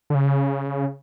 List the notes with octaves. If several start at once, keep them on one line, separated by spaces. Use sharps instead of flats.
D3
C#3